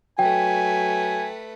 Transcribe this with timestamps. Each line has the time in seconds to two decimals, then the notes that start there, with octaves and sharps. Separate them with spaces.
0.19 F#3 A3 B4 G5 G#5